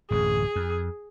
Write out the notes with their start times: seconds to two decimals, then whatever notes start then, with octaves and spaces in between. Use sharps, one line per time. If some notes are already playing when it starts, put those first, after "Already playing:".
0.11 D1 A1 F#2 G#4
0.56 F2